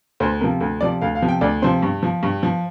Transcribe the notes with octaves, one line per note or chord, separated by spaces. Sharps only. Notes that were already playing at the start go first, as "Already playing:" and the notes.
D2 C5
C3 F3 A#4
D2
C3 F3 D5
D2 F5
F5
C3 F3
G5
D2 D5
C3 F3 C5
G2
F3
G2
F3